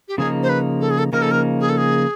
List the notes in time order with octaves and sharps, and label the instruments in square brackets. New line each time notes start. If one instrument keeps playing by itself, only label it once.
[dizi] G4
[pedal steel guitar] C#3 F3 A#3 D#4 [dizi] G#4
[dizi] C5
B4
A4
G#4
A4
[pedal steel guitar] C#3 F3 A#3 D#4 [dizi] A#4
[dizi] A4
A#4
G#4
A4
G#4